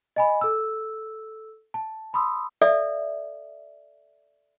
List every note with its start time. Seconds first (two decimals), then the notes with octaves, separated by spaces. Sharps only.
0.16 D#5 G#5 B5
0.41 A4 E6
1.74 A5
2.13 A5 B5 C6 D#6 E6
2.61 A4 D5 E5 F5